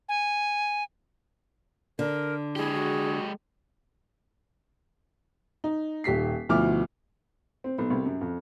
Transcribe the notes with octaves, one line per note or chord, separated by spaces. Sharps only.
G#5
D3 A#4
G#3 E4 G4 G#4
F#4
D#4
D#1 G4 B6 C7
D2 B2 F3 E4 D6 F6
C4
B1
C2
F#2
F2